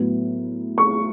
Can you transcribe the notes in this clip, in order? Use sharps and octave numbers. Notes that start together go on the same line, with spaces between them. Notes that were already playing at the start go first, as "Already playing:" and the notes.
Already playing: A2 F#3 B3
C#6